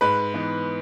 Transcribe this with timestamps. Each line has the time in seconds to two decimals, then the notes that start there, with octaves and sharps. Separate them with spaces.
0.01 G#2 B4 B5
0.34 E3 B3 D#4